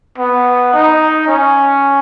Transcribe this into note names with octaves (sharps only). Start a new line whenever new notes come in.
B3
D#4
C#4